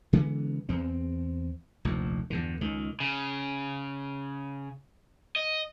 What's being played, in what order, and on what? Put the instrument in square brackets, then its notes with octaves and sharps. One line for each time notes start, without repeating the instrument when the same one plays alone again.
[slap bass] C#3 E3 G#3 B3
E2 C4
F1 A#1 D#2
E2 G2 D3
C#2 D#3
[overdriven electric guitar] C#3
D#5